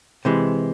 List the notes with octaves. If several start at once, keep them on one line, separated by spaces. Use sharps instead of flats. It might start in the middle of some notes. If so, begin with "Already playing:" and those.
C3 E3 G#3